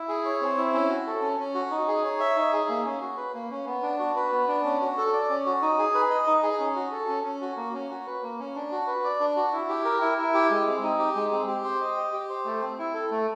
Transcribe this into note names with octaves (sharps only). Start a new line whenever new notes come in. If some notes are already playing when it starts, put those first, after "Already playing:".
Already playing: E4
G#4
C#5
C4
E4
C#4
F#4
A4
C#4
C#4
F#4
D#4
G#4
C#5
E5
D#4
G#4
A#3
C#4
F#4
B4
A#3
C#4
B3
D4
F#4
B4
B3
D4
C#4
F#4
A4
D5
C#4
F#4
D#4
G#4
B4
D#5
D#4
G#4
C#4
F#4
A4
C#4
C#4
F#4
A#3
C#4
F#4
B4
A#3
C#4
D4
F#4
B4
D5
D4
F#4
E4
G4
A#4
E4
E4
G4
G#3
C4
D#4
G4
G#3
C4
G4
C5
D#5
G4
G4
C5
A3
C4
E4
A4
A3